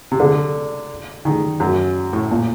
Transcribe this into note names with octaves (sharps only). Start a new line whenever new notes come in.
C3
D3
D#3
F#2
A2
A#2